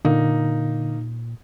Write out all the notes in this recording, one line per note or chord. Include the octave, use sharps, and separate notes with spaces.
A#2 D3 A#3 D#4